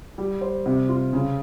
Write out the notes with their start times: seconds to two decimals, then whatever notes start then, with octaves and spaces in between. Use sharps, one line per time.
0.18 G3
0.41 C5
0.66 C3
0.89 F4
1.13 C#3